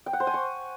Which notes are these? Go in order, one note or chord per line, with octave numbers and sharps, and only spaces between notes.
G5
F#5
C5
G#5
C#6